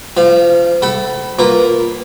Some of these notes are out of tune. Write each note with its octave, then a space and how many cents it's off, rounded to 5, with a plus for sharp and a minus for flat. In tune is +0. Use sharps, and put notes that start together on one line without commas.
F3 -30 F5 +0
A4 +0 F#5 +45 B5 +0
A#3 +0 F4 +0 B4 +0